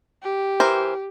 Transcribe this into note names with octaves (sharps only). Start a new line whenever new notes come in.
G4
E3 A#4 C5